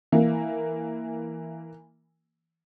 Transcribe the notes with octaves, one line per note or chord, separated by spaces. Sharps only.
E3 A#3